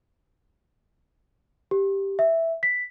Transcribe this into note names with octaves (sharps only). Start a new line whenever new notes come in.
G4
E5
B6